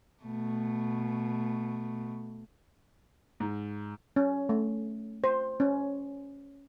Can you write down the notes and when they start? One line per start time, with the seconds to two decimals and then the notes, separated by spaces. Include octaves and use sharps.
0.23 B2 A3
3.40 G#2
4.16 C#4
4.49 A3
5.24 C5
5.60 C#4